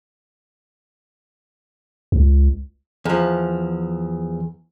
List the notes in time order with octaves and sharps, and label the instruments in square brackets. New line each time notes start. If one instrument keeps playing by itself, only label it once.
[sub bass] C#2
[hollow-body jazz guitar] E2 F3